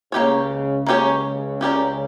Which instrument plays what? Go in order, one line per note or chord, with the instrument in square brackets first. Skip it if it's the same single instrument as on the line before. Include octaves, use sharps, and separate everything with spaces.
[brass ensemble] C#2 C#3 [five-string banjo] A#3 C#4 G4 C#5
[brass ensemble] C#2 C#3 [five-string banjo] A#3 C#4 G4 C#5
[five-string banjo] C#4 G4 A#4 D5